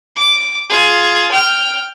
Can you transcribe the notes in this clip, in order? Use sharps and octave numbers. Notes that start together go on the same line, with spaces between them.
D6
F4 G#4
G5 F6